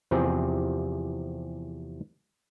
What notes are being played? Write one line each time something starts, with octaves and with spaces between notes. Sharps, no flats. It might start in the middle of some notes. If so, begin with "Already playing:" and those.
E2 C3 F3 C4 G4 G#4